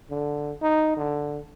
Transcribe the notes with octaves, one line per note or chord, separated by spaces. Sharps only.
D3
D#4
D3